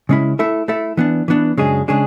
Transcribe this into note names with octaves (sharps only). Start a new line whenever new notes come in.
C#3 G#3 C#4 E4
A3 E4 A4 E5
A3 E4 A4 E5
E3 B3 D4
E3 B3 D4
F#2 C#3 G#3 D4 G#4
C#3 G#3 D4 G#4